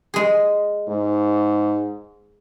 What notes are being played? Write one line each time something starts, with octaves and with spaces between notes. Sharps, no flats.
G#3 G#4
G#2